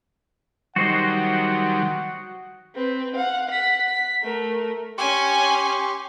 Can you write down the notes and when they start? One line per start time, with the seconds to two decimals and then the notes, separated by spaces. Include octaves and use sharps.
0.76 D#3 F#3 G3 F#4 C5 D#5 F#5
2.75 C4 B4
3.15 F5 F#5
3.50 F#5 B6
3.88 B6
4.22 A3 A#4
4.98 C#4 G4 G#5 C6 C#6